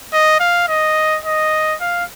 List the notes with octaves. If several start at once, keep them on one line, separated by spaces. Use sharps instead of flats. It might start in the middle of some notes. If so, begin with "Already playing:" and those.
D#5
F5
D#5
D#5
F5